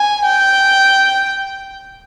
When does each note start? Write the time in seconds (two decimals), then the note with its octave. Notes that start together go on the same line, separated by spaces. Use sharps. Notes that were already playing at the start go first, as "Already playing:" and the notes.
Already playing: G#5
0.25 G5